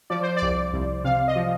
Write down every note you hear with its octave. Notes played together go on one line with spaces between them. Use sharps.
F3 D5
C5
D5
C2
C2
C3 F5
D#5
F3